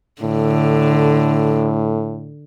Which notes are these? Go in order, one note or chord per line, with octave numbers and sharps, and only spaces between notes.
A2 D3